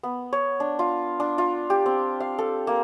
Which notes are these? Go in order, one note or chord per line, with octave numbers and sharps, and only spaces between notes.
B3
C#5
D4
F4
D4
F4
G4
C4
F5
A4
A#3